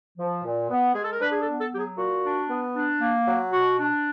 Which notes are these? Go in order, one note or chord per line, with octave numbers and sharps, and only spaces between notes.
F3
A#2
B3
G#3 G#4
A4
A#4
D4 B4
G#4
A4
B3
A4
F#3 G4
G#4
A#2 F#4
D4
B3
D4
A#3
F#3
B2 F#4
D4